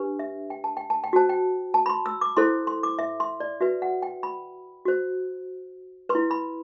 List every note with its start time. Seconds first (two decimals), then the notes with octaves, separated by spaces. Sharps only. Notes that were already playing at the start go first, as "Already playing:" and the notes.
Already playing: D4 G4 B4
0.19 E5
0.50 G5
0.64 A5
0.77 G5
0.90 A5
1.04 G5
1.13 F#4 C5 A5
1.29 G5
1.74 A5
1.86 B5
1.89 C6
2.06 E6
2.21 D6
2.37 E4 A4 C5 C6
2.67 C6
2.83 D6
2.99 E5
3.20 C6
3.40 D5
3.61 F#4 B4 E5
3.82 F#5
4.02 G5
4.23 B5
4.85 F#4 C5
6.09 B4 C6
6.15 E4
6.31 B5